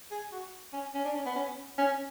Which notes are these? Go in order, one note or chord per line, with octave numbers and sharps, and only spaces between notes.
G#4
F#4
C#4
C#4
D4
C#4
B3
C#4
C#4